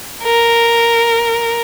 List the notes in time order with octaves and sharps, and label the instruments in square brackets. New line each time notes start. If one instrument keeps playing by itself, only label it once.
[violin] A#4